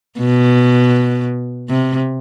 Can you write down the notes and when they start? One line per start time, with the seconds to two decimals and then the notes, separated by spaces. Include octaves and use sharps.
0.19 B2
1.70 C3